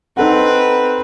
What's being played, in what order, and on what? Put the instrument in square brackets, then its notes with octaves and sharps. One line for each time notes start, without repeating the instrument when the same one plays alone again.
[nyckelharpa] C4 B4 [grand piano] D#4 A4 F#5